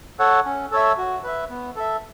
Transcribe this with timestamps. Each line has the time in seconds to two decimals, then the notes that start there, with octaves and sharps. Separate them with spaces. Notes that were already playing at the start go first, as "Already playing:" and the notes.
0.19 A4 C#5 F#5
0.45 C#4
0.71 A4 C#5 E5
0.98 F#4
1.24 B4 E5
1.50 B3
1.76 A4 E5